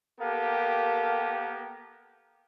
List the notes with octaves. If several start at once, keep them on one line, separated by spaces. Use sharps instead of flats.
A#3 B3 G4 A4 A#4 F5